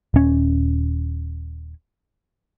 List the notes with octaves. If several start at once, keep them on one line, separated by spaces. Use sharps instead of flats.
D#1 C#4